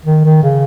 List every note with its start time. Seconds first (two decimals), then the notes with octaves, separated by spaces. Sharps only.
0.05 D#3
0.25 D#3
0.43 C#3